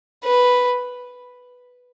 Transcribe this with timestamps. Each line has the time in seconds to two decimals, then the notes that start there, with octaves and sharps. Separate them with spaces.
0.24 B4